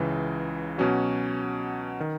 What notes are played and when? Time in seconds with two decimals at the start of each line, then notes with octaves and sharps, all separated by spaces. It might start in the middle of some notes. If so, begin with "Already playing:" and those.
Already playing: C#2 C#3 E3
0.78 B2 F#3 C#4 F#4
2.00 D#3